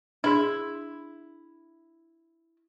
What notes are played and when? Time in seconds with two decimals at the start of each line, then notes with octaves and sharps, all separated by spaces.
0.24 D4 E4 G#4 C6